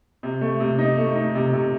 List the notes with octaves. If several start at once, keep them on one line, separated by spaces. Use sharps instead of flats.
C3
A3
C3
D#4
A3
D#4
C3
C3